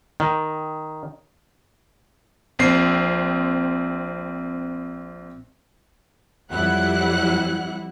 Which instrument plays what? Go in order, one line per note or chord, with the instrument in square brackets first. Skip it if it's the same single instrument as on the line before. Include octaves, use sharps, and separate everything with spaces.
[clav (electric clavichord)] D#3
[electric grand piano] A#1 C4 C7
[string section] F2 F#3 G3 E4 F#5 F#6